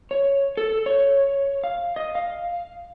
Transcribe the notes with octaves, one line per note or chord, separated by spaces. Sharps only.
C#5
A4
C#5
F5
D#5
F5